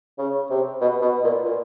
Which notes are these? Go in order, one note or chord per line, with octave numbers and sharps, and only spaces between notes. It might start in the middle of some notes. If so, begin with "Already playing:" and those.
C#3
C3
B2
B2
A#2
A#2